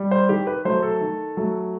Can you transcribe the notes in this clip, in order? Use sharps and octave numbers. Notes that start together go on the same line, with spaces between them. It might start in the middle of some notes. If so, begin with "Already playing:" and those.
Already playing: G3
C5
D#3 G4
B4
F#3 A3 C5
A4
D#3
F#3 A3